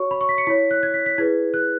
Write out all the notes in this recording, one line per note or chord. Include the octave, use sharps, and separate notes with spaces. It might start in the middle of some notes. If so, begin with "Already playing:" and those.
Already playing: F#4 C#5 C#6
B5
C#6
B6
C#7
E4 C#5 B6
F#6
G#6
B6
B6
E4 G#4 B4 G#6
F#6